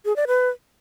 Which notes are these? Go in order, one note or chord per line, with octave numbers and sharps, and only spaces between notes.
G#4
D5
B4